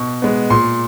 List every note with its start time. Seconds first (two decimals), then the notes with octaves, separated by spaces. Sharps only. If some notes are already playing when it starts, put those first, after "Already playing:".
Already playing: B2 C#6
0.22 G#3 B3
0.50 A#2 C6